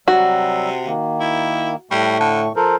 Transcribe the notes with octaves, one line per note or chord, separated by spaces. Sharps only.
C3 F#3 G3 F#4 E6
D#3 A#3
E4
A2 G3 A3 C#6
D3
F3 A4 A#4 C5